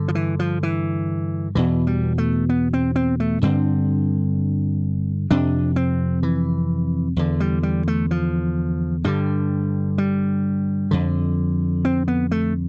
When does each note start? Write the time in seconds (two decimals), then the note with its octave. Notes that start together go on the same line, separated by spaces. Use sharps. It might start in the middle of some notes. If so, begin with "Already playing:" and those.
Already playing: G2 D3
0.08 F3
0.15 E3
0.39 F3
0.63 E3
1.55 E2 B2 E3
1.87 G3
2.18 A3
2.49 B3
2.73 C4
2.96 C4
3.20 A3
3.42 G2 D3 C4
5.30 F2 C3 D4
5.76 C4
6.23 E3
7.16 E2 D3
7.40 G3
7.63 G3
7.88 A3
8.11 F3
9.04 G2 D3 G3
9.98 G3
10.91 F2 D3
11.85 C4
12.08 B3
12.31 A3